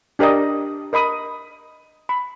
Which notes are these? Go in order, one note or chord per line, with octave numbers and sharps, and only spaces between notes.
D4 G4 A#4 D5 D#5
A#4 D#5 B5 D#6
B5